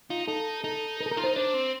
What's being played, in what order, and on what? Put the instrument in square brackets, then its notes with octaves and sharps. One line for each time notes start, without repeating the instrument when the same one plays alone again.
[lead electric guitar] D#4 [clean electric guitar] F4
[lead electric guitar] D#4 [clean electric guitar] A4
[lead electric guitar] D#4 [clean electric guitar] A4
[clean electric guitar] A#4
A4
A#4
[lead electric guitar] F4
[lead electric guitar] D#4 [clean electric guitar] C5
[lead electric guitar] D4 [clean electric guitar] C5
[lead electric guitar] C4